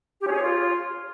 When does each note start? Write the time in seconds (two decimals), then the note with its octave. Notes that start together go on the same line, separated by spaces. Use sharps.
0.21 G4
0.26 C#4
0.31 G#4
0.36 C#5
0.41 F4